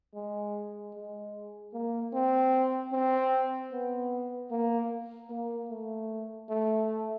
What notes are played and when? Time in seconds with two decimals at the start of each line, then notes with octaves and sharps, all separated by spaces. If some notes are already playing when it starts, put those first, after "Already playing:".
0.15 G#3
0.94 G#3
1.74 A#3
2.13 C4
2.93 C4
3.72 B3
4.51 A#3
5.30 A#3
5.70 A3
6.49 A3